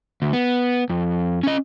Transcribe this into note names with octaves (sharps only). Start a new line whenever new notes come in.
D2
B3
F2
C#4 D#5